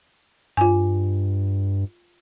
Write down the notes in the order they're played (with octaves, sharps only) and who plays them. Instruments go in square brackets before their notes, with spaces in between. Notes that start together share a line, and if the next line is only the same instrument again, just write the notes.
[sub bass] G2 [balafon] F4 G#5